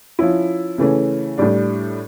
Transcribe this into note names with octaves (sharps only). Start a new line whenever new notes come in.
F3 C#4 E4
C#3 E3 A3 C#4
A2 G3 D4